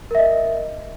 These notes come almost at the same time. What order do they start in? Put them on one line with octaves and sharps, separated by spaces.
A#4 E5 D#5